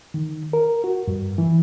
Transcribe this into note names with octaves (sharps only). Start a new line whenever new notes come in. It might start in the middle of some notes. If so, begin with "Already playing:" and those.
D#3
A#4
F#4
G2
E3